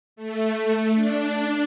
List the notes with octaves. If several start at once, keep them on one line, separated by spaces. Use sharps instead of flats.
A3
D4